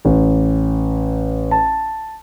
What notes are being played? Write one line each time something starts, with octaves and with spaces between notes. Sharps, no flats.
A1
A5